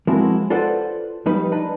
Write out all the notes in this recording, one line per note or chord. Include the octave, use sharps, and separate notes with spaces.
F3 G#3 C4 E4 F#4 A#4
F4 A4 B4 C5 D5 F#5
F3 G3 D#4 B4
D4 D#4 B4